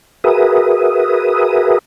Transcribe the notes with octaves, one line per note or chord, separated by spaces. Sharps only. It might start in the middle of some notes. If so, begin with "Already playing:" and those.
F#4 G#4 A#4 B4 E5 D#6